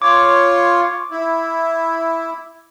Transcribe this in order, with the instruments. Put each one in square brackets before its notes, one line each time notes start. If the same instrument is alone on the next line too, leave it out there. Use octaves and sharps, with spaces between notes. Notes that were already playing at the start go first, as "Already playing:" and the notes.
[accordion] F4 C#5 [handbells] D6
[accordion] E4